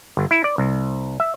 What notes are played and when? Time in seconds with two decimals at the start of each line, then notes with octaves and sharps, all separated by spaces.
0.17 G1
0.31 E4
0.44 D5
0.58 C2
1.20 E5